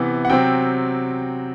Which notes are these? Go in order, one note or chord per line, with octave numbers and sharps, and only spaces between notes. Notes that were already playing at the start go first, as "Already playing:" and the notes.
Already playing: C3 E3 B3
F#5
C3 F#3 C4 G5